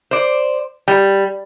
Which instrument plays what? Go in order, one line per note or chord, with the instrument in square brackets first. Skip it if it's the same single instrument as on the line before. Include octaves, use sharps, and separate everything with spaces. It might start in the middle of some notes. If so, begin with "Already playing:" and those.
[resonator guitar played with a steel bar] C5 D5
G3